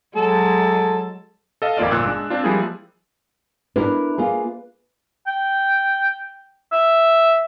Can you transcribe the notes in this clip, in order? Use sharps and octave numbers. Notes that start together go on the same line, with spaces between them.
F#3 G#3 A4
A4 D#5 F5
G#1 F2 A#3 F4 D5 F5
G1 A#2 E6 F#6
G#3 D4
C4 D4 F4
F3 G3 G#3 A#3 E4 G#4
D4 E4 A#4 B4
A#3 F4 G#4
G5
E5